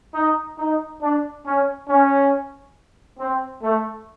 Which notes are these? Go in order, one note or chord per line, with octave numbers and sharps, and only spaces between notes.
D#4
D#4
D4
C#4
C#4
C4
A3